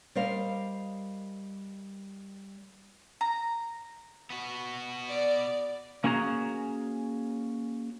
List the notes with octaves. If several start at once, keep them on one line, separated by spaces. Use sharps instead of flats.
G3 A#4 C5 D#5 F5
A#5
B3 F#4
D5
A#3 C#4 F#4 G#4 A#5